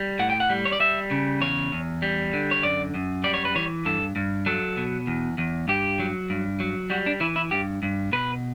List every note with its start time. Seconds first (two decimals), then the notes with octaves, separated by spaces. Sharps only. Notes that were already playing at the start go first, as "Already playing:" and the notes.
Already playing: G3
0.19 A2 F#5
0.30 G5
0.40 F#5
0.50 G3
0.65 C#5
0.72 D5
0.80 G3 E5
1.11 C#3
1.41 E2 C#5
1.72 E2
2.02 G3
2.33 D3
2.51 C#5
2.63 F#2 D5
2.94 F#2
3.24 G3 D5
3.34 C#5
3.45 B4
3.55 E3 C#5
3.85 G2 A4
4.16 G2
4.46 F#3 A4
4.77 B2
5.07 E2
5.38 E2
5.68 G2 G4
5.99 F#3
6.30 G2
6.60 F#3
6.90 G3 F#4
7.06 D4
7.20 E3 E4
7.36 E4
7.51 G2 G4
7.83 G2
8.12 B2 B4